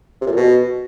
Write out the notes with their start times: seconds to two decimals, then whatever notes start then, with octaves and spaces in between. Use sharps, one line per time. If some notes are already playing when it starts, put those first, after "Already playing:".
0.21 C3
0.26 A#2
0.32 F2
0.37 B2